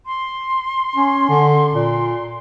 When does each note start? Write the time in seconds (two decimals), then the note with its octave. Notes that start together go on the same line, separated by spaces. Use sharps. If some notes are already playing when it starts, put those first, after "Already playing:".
0.06 C6
0.96 C#4
1.29 D3
1.74 A#2